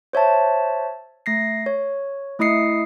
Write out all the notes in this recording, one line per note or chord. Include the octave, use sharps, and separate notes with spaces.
C5 C#5 E5 A5
A3 A#6 C7
C#5
A3 E4 D#5 D#6 C7 C#7